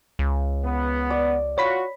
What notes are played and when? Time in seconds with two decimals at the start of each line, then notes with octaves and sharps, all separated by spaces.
0.19 C#2
0.64 B3
1.10 D5
1.58 F4 F#4 C#5 B5 B6